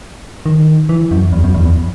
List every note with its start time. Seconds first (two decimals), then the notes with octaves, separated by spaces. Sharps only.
0.46 D#3
0.89 E3
1.11 F#2
1.32 E2
1.44 F#2
1.54 E2
1.65 E2